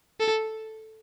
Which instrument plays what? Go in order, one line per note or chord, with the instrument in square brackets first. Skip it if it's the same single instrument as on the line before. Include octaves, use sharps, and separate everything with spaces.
[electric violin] A4